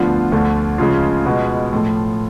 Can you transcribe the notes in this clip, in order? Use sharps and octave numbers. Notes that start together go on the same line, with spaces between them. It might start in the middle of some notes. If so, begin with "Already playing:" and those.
Already playing: D2 D3 F3 B3 F4
D2 D3 F3 A3
C#2 C#3 F3 G#3 F4
B2 G#3 B3
A2 F3 A3 F4